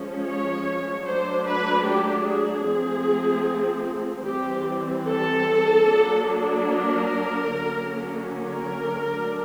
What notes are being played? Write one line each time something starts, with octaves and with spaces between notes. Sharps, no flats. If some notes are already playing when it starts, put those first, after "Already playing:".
Already playing: F3 G#3 C#4
C#5
F#3 A3 D4 C5
B4
G4
G#4
F3 A3 C4
E3 G3 C4 G4
A4
F#3 A#3 D4
A#4
D3 F#3 A#3 C#4
A#4
F#3 A3 D4